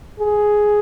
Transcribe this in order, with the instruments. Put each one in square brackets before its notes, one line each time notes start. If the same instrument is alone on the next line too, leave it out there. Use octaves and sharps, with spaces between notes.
[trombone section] G#4